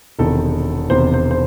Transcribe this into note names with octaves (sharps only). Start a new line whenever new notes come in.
E1 E2 C3 D#3 A4
E1 E2 C3 D#3 C5
C5
C5